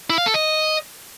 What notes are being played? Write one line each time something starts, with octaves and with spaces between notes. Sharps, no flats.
E4
F5
A4
D#5